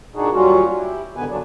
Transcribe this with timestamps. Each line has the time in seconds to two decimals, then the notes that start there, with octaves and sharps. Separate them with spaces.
0.15 A#2 D4 D#4 F#4 G#4
0.33 D#2 F#3 G3 C#4 F4 F#4
0.76 E4 G4
1.16 G#2 D3 D#3 B3 B4 G#5
1.29 G2 D3 F#3 D4